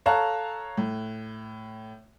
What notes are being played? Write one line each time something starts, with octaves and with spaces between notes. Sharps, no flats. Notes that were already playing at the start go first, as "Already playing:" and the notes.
A4 C#5 F5 A5 A#5 F#6
A2